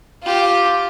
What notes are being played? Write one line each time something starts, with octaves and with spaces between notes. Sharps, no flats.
F4 G4